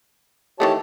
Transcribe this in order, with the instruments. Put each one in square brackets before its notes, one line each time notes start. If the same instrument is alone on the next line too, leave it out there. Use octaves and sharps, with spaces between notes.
[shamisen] D#3 E3 A3 [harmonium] G4 C#5 A5